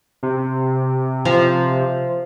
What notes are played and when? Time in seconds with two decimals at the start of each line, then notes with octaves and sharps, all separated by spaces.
0.23 C3
1.25 F3